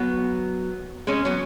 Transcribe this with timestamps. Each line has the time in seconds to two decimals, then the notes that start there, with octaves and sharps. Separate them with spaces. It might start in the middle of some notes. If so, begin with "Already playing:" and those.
Already playing: F#3 B3
1.07 G#3 C#4
1.25 F#3 B3